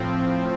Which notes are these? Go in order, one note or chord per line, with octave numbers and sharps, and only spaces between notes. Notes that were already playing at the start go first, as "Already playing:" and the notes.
Already playing: A2 F3 C4